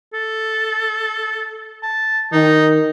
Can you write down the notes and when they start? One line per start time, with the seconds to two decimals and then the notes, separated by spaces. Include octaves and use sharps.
0.13 A4
1.83 A5
2.32 D#3 D#4